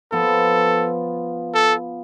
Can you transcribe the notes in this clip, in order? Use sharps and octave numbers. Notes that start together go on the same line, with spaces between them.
F3 B3 F4 A4
A4